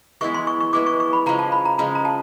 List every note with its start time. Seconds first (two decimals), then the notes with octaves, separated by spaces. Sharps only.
0.21 E3 G#3 B3 E4 C#6
0.34 C6
0.47 C#6
0.60 C#6
0.73 E3 G#3 B3 E4 D6
0.86 C#6
1.00 C#6
1.13 B5
1.26 C#3 F3 G#3 C#4 A#5
1.39 A5
1.52 B5
1.65 A#5
1.78 C#3 F3 G#3 C#4 A#5
1.95 A#5
2.05 A5